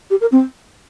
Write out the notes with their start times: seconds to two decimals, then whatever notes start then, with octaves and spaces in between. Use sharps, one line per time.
0.10 G4
0.21 A#4
0.32 C4